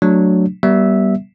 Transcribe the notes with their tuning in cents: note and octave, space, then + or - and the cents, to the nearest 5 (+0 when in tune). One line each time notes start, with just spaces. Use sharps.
F#3 +0 A3 +0 D4 +0
G3 -20 B3 -35 E5 -10